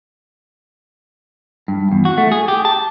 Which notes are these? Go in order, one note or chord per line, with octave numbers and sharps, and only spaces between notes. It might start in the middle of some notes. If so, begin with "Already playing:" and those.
G2
E2
F#4
A3
G#4
G4
A5